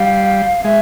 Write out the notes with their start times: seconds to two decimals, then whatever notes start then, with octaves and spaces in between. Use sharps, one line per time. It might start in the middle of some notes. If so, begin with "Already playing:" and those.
Already playing: G3 F5
0.64 G#3 E5